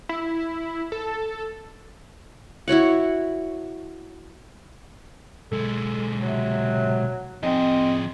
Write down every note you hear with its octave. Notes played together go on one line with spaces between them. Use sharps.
E4
A4
E4 F#4 C#5 F#5
B1 G#3 A4
C3 F#3
F3 C4 G#4 D#5